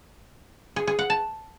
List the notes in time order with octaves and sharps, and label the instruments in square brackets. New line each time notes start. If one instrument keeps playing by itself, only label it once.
[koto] G#4
G#4
F#5
A5